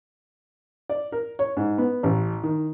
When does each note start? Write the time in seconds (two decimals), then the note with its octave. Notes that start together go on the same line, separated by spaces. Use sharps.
0.89 D5
1.12 A#4
1.39 C#5
1.57 G#2
1.78 B3
2.03 A1
2.43 D#3